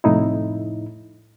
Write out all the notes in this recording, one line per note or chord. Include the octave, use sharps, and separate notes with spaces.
C2 F2 A2 D#4 E4